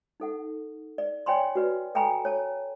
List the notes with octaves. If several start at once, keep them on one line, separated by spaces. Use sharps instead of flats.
D#4 A4 F#5
D5
C#5 D5 G5 G#5 B5 C6
F#4 B4 D5
A4 G5 G#5 A#5 B5
C#5 A5